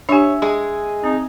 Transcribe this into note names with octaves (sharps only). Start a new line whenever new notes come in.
D4 G4 C#5 E5 G#5
G#3 G#4 D#5
C4 D#4